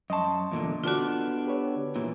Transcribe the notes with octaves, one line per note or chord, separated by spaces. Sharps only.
F#2 D#5 A5 C6 C#6
E2 A#2 D3
D3 B3 D4 F4 F#4
G4 B4 C#5
A#2 E3